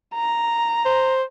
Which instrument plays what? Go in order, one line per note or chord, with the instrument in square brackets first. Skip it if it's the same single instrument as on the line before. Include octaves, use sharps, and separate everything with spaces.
[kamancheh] A#5
[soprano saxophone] C5